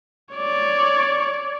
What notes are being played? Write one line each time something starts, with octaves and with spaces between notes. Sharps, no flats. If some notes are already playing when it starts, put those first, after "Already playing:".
C#5 D5